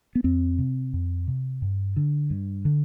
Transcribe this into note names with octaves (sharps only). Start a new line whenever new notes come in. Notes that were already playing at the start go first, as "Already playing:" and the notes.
B3
F2 C4
C3
F2
C3
G2
D3
G2
D3